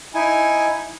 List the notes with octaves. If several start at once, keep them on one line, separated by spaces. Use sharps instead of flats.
D#4 E4 G#5